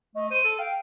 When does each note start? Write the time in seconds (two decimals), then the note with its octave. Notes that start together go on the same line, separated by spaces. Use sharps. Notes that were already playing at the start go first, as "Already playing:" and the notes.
0.15 A3 D#5
0.31 C5 D#7
0.44 A4
0.59 F5 G5